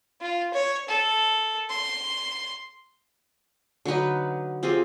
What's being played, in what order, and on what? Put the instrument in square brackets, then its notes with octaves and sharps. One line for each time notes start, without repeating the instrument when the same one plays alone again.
[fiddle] F4
C#5
A4
C6
[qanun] D3 F#3 D#4 B4
C4 F4 G4 G#4